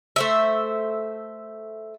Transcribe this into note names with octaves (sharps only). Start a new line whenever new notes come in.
A3 C5 E5